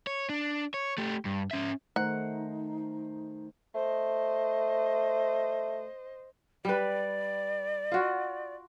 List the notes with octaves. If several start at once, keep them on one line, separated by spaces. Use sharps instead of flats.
C#5
D4
C#5
A3 G4
G2
C#4 E5
D#3 A3 D#4 C5 F#5 A#5
A3 C5 D#5
G3 B4 D5
F4 F#4